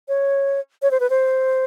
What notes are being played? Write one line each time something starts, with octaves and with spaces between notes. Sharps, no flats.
C#5
C#5
C5
B4
C5